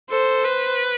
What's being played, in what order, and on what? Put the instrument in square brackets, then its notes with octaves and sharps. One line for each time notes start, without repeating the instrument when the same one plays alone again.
[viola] A4 [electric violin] C5
[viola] B4